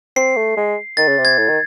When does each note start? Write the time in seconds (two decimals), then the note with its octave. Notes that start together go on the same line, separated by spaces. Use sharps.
0.16 C4 C7
0.37 A3
0.57 G#3
0.97 D#3 A6
1.08 C#3
1.18 C3
1.25 G#6
1.38 A2
1.49 D#3